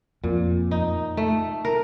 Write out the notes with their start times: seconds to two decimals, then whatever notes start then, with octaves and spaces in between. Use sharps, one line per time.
0.24 F2 A#2
0.71 D#4
1.17 A3
1.65 A#4